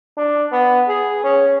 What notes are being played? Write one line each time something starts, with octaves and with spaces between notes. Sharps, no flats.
D4
B3
G#4
C#4